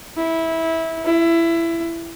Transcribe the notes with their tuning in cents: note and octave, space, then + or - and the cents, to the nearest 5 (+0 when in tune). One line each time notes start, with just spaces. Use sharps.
E4 -15
E4 +20